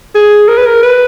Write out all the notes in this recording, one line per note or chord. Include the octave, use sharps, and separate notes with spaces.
G#4
A#4
B4
A#4
B4